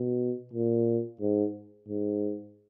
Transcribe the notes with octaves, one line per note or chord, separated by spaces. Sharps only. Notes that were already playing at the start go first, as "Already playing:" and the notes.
Already playing: B2
A#2
G#2
G#2